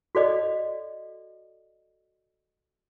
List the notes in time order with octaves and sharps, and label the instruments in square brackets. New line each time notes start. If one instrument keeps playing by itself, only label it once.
[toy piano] F#4 A4 D5 D#5